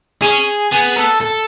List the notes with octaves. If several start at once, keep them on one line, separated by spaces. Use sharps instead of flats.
C#4 G#4
B3 G#4
A4
A4